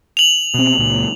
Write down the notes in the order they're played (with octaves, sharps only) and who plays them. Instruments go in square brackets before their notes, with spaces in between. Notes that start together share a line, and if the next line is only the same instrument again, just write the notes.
[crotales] F7 F#7
[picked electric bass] B2 C4
C#2 A#2